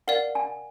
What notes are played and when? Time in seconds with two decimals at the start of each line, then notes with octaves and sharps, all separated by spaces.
0.08 A#4 D5 F5 F#5
0.35 G#5